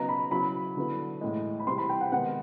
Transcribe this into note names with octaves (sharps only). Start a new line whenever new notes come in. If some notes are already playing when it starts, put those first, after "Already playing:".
Already playing: C#3 F#3 B3 D#4 A#5
B5
C#3 F#3 B3 E4 B5
D3 F#3 B3 E4
A2 E3 G#3
B5
C3 E3 G3 C6
B5
G5
F#5
C3 D#3 G#3 B3 F#5